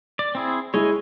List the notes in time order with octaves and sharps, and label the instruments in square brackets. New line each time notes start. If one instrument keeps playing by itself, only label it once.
[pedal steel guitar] D5
C4 E4 G#4
[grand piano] G#3 E4 [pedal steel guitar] C#5 D#5 G#5